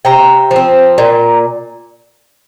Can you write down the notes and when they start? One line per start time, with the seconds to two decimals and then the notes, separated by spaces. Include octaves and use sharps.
0.05 C3 G5 A#5
0.51 F3 C4
0.98 A#2